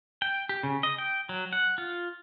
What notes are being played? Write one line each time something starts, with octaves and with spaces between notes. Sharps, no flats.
G5
G4
C#3
D#5
G5
F#3
F#5
F4